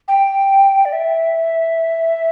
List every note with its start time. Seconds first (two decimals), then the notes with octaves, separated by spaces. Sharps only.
0.08 G5
0.85 D5
0.93 E5